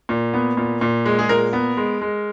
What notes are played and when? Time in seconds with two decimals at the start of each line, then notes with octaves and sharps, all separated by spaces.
0.09 A#2
0.34 B3
0.57 A#2
0.81 A#2
1.06 G#3
1.19 G#4
1.29 A#2 A#4
1.53 B3
1.77 G#3
2.01 G#3